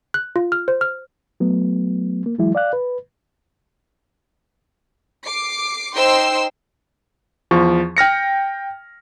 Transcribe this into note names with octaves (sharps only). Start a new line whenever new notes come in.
F#6
F4
F6
C5
F6
F#3 A3 B3
A#3
E3 F#3 G#3 E4
D5 F5 F#6
B4
D6 C7
D#4 C5 G5 C6 E6 C7
E2 F3 C#6
G5 F6 A#6 C#7